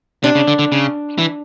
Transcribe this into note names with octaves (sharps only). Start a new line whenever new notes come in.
C3 D4
C#3
D3
D3
C#3
E3